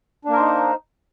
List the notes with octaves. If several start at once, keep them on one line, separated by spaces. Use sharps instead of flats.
A#3 D4 D#4 A#4 C5